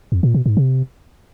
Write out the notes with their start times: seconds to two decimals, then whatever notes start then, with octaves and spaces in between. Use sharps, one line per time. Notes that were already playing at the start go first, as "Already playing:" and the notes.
0.12 F2
0.23 A#2
0.34 B2
0.46 G#2
0.57 C3